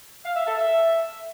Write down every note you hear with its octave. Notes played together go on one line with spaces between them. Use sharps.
F5
E5
A4
E5